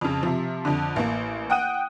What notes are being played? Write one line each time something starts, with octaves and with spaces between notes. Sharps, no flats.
F2 C#3
C3 F3
F2 D3
A1 A#3
F#5 G5 D#6 F#6 D#7